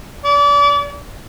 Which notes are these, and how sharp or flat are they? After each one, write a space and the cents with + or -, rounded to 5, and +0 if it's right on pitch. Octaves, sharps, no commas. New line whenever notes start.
D5 -35